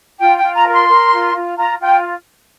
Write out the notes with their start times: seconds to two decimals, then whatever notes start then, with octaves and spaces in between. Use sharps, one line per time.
0.20 F4 G5
0.37 G5
0.43 F4
0.55 A#5
0.66 A#4
0.72 C6
0.89 A#4
1.12 F4
1.34 F4
1.57 F4 A#5
1.80 F4 G5